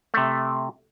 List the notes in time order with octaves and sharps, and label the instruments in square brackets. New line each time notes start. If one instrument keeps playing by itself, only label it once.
[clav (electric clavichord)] C3 A3